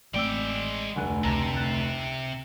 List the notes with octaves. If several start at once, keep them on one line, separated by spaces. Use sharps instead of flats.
A1 G#3 A3 C4 D5 G5 D6 E6
F1 D2 F#5 G#5 F#6
C#2 C3 A5 A#5 A#6
F#6 A6